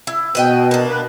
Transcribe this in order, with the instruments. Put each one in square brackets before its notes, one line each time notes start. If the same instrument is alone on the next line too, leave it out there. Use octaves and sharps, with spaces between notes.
[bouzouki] E4
[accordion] B2 [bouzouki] B4 D#5 G5
[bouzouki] A#3 D4
[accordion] B4